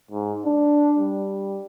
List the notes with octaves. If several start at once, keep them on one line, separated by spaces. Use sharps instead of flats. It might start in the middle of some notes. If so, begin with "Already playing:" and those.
G#2
D4
G3